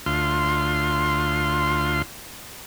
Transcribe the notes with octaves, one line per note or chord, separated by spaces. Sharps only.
D2 F4 C6